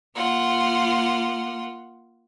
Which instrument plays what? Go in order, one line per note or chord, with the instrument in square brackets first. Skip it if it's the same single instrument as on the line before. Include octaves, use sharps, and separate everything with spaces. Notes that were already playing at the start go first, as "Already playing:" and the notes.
[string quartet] A#3 F4 F#5